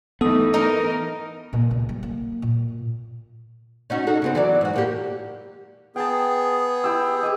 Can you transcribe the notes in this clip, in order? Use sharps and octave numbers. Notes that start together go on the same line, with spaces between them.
E3 A3 B3 D#4 A4 D#6
E3 D#4 A#4 D#5
A#2
C#2
G3
A#3
A#2
C#4 D#4 F#4
D#4 F#4 A4
C#3 B3 C4
E3 F#3 D5
G#2 F#4
A2 A#3 G4
B3 G#4 G5 A5
E4 G4 E6
G4 D#5